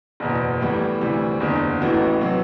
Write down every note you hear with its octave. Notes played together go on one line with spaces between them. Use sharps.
F#1 E2 B2
A2 E3 G3 B3
D2 C3 E3 G3
F#1 E2 D3
A1 A2 E3 B3 F#4
C3 F#3 B3